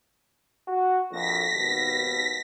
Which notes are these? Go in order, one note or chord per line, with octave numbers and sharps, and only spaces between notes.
F#4
A#1 F2 A#6 B6
G#1 D#2 B2